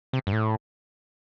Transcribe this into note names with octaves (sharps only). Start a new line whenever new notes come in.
C3
G2
A2